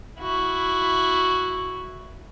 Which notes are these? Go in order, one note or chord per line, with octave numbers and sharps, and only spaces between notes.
E4 F#4